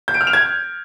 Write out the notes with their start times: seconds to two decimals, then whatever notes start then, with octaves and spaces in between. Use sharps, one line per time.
0.08 G6
0.14 D7
0.21 F6
0.27 F7
0.33 G#6